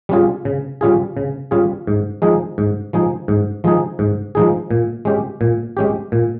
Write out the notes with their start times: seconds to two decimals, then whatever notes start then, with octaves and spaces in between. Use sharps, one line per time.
0.09 G3 C#4 F4 G#4
0.45 C#3
0.81 G3 C#4 F4 G#4
1.17 C#3
1.51 G3 C#4 F4 G#4
1.87 G#2
2.22 F3 G#3 D#4 G#4
2.58 G#2
2.93 F3 G#3 D#4 G#4
3.28 G#2
3.64 F3 G#3 D#4 G#4
3.99 G#2
4.35 F3 G#3 D#4 G#4
4.71 A#2
5.05 G#3 C#4 G4
5.41 A#2
5.77 G#3 C#4 G4
6.12 A#2